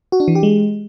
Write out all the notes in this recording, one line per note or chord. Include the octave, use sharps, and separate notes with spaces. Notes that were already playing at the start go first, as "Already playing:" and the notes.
F#4
D4
E3
G4
G#3